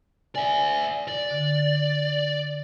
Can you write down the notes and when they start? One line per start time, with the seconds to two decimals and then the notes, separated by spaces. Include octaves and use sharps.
0.35 D5 E5 G#5
1.08 D5
1.31 D3